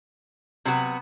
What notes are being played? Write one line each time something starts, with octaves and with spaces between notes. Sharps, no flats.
C3 F#3 B3 F#4